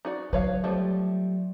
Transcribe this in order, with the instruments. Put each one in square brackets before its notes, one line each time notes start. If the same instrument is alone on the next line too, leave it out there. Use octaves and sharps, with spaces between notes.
[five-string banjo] D#4 F#4 D5
[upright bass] F#3 [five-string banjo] B4 C#5 F5
[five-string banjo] F3 G3 A3